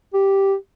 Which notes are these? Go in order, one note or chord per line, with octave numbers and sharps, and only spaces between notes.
G4